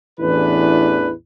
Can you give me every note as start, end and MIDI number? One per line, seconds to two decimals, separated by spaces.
0.20 1.11 33
0.20 1.11 40
0.20 1.11 52
0.20 1.11 62
0.20 1.11 71